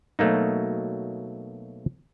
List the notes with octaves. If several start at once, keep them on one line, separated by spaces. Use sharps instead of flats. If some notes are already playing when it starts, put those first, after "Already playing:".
B2 F#3 A3 A#3 D#4